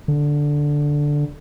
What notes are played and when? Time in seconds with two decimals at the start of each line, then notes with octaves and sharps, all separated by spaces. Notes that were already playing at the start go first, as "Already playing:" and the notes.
0.08 D3